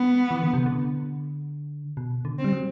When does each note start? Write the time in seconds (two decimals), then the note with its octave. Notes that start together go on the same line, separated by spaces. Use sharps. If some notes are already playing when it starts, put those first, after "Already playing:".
Already playing: B3
0.31 E3
0.42 D3
0.54 C3
0.66 D3
1.97 B2
2.25 D3
2.38 C4
2.44 G3
2.52 F#3